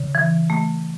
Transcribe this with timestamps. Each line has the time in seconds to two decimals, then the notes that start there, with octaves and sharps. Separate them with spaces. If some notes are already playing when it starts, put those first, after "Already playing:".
Already playing: C#3
0.15 E3
0.50 A3